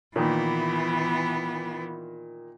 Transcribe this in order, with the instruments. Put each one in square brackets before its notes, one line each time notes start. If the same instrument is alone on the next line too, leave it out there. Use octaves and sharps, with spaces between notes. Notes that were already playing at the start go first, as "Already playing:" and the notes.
[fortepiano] A#2 D#3 [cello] E3 B3